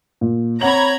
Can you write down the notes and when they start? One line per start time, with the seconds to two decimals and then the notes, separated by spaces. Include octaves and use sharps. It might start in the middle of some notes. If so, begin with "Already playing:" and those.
0.21 A#2
0.61 C4 C#5 F#5 A#5 B5 G#6 F#7